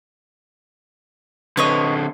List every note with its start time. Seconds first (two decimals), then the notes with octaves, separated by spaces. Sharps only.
1.57 D3 C4 B4 C#5 D#5